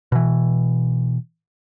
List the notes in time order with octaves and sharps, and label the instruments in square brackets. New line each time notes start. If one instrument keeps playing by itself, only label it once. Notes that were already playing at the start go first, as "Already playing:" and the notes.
[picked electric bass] B2 E3